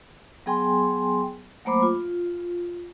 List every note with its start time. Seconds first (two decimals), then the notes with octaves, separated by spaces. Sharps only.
0.46 F#3 B3 G#4 G5 G#5 C6
1.65 F#3 A3 A#3 C5 B5 D6
1.83 F4